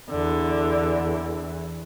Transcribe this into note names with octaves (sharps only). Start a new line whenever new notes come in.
E2 D3 E3